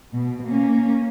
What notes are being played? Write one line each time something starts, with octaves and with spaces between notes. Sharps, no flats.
B2
A#3 C#4